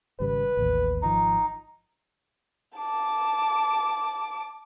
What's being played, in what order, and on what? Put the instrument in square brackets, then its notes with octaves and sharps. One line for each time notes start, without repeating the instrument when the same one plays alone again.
[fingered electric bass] G#1 C#3 G3 [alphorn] B4
[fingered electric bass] A1 D#2
[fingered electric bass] G#1 C#3 F3 [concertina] D#4
[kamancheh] A5 D6